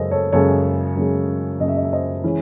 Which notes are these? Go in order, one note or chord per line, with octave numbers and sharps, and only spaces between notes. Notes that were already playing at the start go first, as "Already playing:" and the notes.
Already playing: F#2 C#3 G#3 A4 C5 D#5
A4 C#5
F#2 C#3 G#3 A4 C#5
F#2 C#3 G#3
F#2 C#3 G#3 D#5
E5
D#5
E5
C5 D#5
E3 G#3 C#4 E4